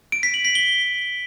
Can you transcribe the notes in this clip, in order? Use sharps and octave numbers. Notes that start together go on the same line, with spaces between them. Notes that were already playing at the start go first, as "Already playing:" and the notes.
D7
B6
F#7
B6
G7